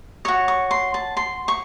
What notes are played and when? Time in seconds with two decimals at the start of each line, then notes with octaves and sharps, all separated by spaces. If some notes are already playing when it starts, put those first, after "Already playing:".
0.25 F#4 C#5 C#6
0.48 C#6
0.71 C6
0.94 A5
1.17 C6
1.48 C#6